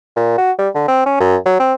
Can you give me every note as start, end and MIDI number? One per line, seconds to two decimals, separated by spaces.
0.16 0.34 46
0.38 0.52 66
0.58 0.69 55
0.75 0.85 50
0.88 1.05 60
1.06 1.20 61
1.20 1.36 42
1.46 1.56 54
1.59 1.74 60